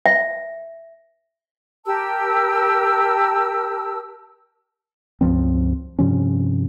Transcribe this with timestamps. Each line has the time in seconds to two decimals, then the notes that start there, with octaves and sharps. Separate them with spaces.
0.06 E5
1.85 G4 A#4 A5 E6
5.21 C#2 G2 F3 C4
5.99 G2 C3 F3 C#4